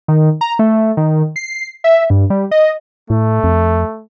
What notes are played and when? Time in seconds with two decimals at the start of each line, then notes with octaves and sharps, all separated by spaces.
0.08 D#3
0.41 A#5
0.59 A3
0.97 D#3
1.36 C7
1.84 E5
2.10 G2
2.30 G3
2.51 D#5
3.10 A2 A3
3.44 F2